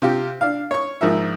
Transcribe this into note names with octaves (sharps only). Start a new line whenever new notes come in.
C3 F4 G4
D4 F5
C#5 C#6
A#1 G#2 F3 A#4 E5